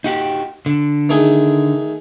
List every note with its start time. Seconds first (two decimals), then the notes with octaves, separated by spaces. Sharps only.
0.04 D#4 F#4 G4
0.66 D3
1.09 D#3 A3 G#4